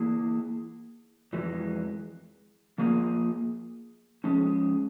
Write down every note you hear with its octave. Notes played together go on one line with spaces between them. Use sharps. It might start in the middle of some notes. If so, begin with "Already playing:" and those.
Already playing: E3 A#3 E4 G#4
F2 E3 G#3
F3 A#3 F4 G#4
F3 G#3 C#4